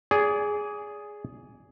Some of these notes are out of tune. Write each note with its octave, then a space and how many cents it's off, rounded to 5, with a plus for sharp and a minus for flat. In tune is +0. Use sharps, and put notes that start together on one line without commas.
G#4 +0 D5 -30